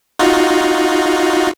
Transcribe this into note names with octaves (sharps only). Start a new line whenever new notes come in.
D#4 F4 F#4